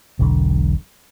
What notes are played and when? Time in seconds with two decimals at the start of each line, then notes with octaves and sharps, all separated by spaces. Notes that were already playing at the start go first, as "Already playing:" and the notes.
0.19 E1 B1 D3